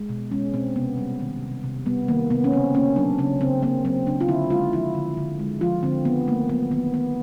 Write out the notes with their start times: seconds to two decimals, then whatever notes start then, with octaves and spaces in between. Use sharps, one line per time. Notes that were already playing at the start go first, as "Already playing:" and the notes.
Already playing: G#3
0.09 B2
0.31 G#3 C#4
0.54 B2 C4
0.76 C3 B3
0.98 G3
1.20 D#3
1.42 C3
1.64 C3
1.86 G3 B3
2.08 D#3 A#3
2.30 C3 B3
2.44 C#4
2.52 C#3 C4
2.75 A#3 C#4
2.96 F#3 D4
3.18 C#3 C#4
3.41 C#3 C4
3.63 A#3 C4
3.85 F#3 C4
4.07 C#3 D4
4.21 F4
4.28 D3 E4
4.50 G#3 F4
4.73 F3 E4
4.95 D3
5.17 D3
5.39 G#3
5.61 F3 F4
5.83 D3 C4
6.05 D#3 B3
6.27 A3 A#3
6.49 F#3 B3
6.71 D#3 B3
6.94 D#3 B3